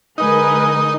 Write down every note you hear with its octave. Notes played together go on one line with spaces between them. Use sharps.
D3 G#3 D#4 A#4 B4 G#5